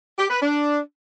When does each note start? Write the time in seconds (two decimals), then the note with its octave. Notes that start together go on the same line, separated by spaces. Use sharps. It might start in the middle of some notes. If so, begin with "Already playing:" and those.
0.19 G4
0.30 B4
0.42 D4